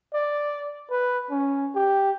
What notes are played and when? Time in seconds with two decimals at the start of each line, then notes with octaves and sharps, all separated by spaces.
0.14 D5
0.91 B4
1.31 C#4
1.75 G4